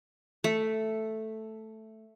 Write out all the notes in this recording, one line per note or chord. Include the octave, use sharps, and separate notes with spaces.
A3